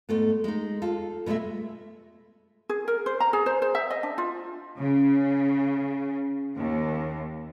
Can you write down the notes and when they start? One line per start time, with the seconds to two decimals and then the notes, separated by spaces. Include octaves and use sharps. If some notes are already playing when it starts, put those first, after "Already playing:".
0.09 G#2 A3 B3
0.44 G#3 D#4
0.82 F4 A4
1.26 B2 F3 G#3 A3 E5
2.69 G#4
2.88 A#4
3.06 C5
3.20 A#5
3.33 G#4
3.46 C5
3.62 C5
3.75 E5
3.90 D#5
4.03 D4
4.18 F4
4.79 C#3
6.56 D#2